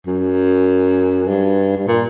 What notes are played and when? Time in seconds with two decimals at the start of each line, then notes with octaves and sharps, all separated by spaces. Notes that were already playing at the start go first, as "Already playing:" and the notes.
0.07 F#2
1.27 G2
1.77 G2
1.88 A#2